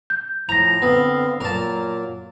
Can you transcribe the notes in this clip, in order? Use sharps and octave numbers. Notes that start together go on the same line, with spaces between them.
G6
A2 F3 A#5 A#6 F7
D3 B3 C4 F5
A#2 F#3 A#3 A#4 A5